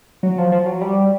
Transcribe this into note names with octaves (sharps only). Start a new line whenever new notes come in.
F#3
F3
F3
F#3
G3